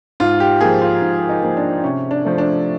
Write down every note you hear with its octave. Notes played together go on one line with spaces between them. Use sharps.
G#2 F4
G4
F3 A#3 G#4
F4
G#2
D#4
F3 A#3
D4
C3 C#4
D4
F3 A3
D4